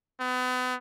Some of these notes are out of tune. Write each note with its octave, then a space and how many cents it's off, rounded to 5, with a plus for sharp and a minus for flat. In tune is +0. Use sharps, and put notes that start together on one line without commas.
B3 +35